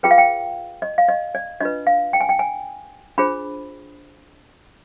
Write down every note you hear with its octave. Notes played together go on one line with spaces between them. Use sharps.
F4 G#4 B4 G5
F5
G5
D#5
F5
D#5
D5
D4 F4 B4 D#5
F5
G5
G#5
G5
G#5
D4 F4 G#4 C5 B5